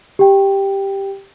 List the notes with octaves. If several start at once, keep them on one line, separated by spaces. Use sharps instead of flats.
G4 G5